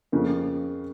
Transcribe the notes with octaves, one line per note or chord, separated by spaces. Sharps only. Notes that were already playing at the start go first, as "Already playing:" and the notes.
F2 C#3 F3 A#3